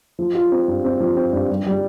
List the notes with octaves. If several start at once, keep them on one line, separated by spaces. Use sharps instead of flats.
F3
F4
C4
G2
C4
F3
C4
G2
G3
G3